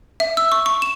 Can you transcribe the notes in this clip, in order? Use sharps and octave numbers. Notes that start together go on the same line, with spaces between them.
E5
E6
C#6
C#6
E7